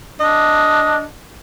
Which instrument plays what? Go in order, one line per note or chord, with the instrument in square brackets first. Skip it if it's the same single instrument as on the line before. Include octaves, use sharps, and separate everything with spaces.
[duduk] D4 [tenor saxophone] D#5